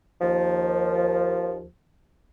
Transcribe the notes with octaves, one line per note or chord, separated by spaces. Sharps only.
D#2 F3